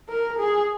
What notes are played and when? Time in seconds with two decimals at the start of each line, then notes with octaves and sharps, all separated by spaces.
0.09 A#4
0.39 G#4